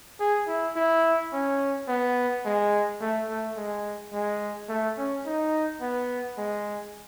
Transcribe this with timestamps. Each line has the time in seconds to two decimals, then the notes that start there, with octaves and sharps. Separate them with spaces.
0.20 G#4
0.48 E4
0.76 E4
1.33 C#4
1.88 B3
2.45 G#3
3.01 A3
3.29 A3
3.57 G#3
4.13 G#3
4.69 A3
4.97 C#4
5.26 D#4
5.81 B3
6.38 G#3